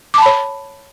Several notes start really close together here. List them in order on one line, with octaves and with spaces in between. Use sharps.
D6 A5 B5 C#5